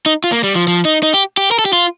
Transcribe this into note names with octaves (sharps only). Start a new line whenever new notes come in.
D#4
F4
A#3
G3
F3
F3
D#4
D#4
G4
G4
A#4
A4
G4
F4